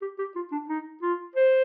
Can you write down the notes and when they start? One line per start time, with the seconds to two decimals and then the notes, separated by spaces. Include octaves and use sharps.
0.02 G4
0.19 G4
0.36 F4
0.52 D4
0.69 D#4
1.03 F4
1.36 C5